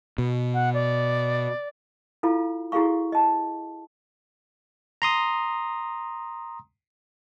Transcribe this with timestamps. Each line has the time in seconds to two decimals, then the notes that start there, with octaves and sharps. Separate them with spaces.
0.18 B2
0.53 F#5
0.73 D5
2.23 E4 F4 A4 F5
2.72 E4 F#4 G#4 A4 F5 C#6
3.12 D#5 A5
5.02 A#5 C6 D#6